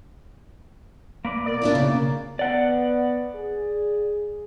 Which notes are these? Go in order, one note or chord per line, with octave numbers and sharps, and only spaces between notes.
A#3 B4 D5
B2 A#4 D5
A#3 D4 E4 F4
C#3
B3 D5 F#5
G#4